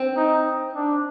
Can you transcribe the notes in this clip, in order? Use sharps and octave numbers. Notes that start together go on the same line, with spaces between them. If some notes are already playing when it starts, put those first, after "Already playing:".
Already playing: C4
D#4
D4